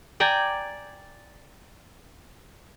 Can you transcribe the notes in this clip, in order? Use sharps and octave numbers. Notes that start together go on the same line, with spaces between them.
D5 G5 G#5 A#5